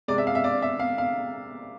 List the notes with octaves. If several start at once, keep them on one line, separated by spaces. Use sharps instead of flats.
C3 G#3 D5
E5
F5
E5
D5
E5
F5
F5